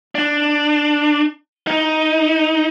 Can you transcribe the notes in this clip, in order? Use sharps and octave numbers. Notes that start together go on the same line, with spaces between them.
D4
D#4